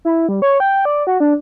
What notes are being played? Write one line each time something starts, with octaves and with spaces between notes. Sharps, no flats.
E4
G3
C#5
G5
D5
F#4
D4